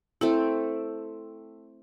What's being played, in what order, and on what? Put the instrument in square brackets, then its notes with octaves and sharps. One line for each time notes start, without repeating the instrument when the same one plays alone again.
[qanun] A3 C4 A4 [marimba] E4